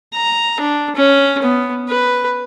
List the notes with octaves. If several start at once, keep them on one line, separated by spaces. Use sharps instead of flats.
A#5
D4
C#4
B3
B4